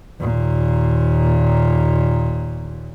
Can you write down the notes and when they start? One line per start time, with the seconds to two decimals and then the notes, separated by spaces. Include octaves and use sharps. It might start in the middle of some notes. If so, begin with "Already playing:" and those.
0.20 D#2 A#2